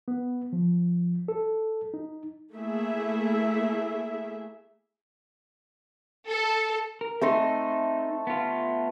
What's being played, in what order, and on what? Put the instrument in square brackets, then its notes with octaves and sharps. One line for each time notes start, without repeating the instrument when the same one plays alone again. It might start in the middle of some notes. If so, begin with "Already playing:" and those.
[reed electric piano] B3
F3
A4
D#4
[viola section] A3 A#3 E4 G#4 E5
[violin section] A4
[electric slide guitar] A#4
[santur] A3 A4 C6 [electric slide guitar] C4 D#4
[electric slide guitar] B3 F4